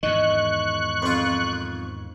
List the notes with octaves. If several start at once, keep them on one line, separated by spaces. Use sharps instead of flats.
E2 G#2 D#3 D#5 C#6 F#6
F2 F4